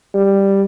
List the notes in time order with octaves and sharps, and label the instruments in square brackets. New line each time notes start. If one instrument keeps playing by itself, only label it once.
[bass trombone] G3